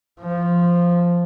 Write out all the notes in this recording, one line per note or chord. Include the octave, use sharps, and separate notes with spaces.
F3